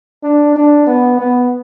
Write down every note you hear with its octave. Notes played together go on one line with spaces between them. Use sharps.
D4
D4
B3
B3